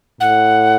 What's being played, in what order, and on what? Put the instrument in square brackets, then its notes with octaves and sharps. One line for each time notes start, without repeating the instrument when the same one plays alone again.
[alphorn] A2 [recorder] F#5